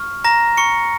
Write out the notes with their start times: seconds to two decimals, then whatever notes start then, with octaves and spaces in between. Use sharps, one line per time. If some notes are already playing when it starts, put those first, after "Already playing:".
Already playing: C#6 F6
0.24 A#5 A#6
0.57 C#6 C#7